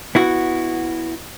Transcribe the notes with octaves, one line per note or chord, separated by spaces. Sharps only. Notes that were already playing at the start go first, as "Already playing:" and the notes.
B3 E4 F#4